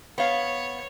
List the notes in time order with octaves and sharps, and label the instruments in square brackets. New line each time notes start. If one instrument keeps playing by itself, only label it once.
[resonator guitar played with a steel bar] B3 F5 [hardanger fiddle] C#5